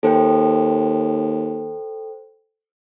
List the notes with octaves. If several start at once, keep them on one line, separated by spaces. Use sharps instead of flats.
D#2 A4 C5 G5